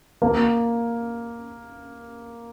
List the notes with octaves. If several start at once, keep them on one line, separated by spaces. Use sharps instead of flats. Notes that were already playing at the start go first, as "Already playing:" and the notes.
A#3